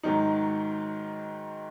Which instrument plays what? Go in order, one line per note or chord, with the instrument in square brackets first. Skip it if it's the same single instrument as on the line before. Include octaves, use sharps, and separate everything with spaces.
[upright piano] G#2 D#3 F#3 D#4